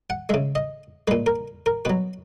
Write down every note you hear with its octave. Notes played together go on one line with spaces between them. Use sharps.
F#5
C#3 G#3 E5
D#5
A#2 G#3 B4
A#4
A#4
B2 F#3 B4